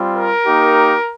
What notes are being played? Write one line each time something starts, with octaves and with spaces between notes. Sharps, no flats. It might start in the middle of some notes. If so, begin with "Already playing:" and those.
Already playing: G3 C4 F4
A#4
A#3 D#4 G4